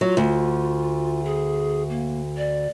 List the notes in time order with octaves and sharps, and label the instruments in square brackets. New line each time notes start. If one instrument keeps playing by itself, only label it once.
[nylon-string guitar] F#3 [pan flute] F4
[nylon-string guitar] D2
[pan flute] G#4
A#3
D5